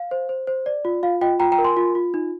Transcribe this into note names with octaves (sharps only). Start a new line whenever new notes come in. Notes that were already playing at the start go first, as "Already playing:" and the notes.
Already playing: F5
C5
C5
C5
D5
F4
F4 F5
F4 D#5 G5
F4 G5 A#5
G5 A#5
A#4
G#5 C6
F4
F4
D#4